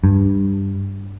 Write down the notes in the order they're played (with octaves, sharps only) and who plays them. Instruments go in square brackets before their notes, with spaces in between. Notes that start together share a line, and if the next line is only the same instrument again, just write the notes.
[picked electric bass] G2